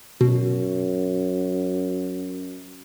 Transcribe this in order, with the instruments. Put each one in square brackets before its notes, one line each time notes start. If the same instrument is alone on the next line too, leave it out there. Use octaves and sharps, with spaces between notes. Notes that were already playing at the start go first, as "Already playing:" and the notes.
[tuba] F#2 [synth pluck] B2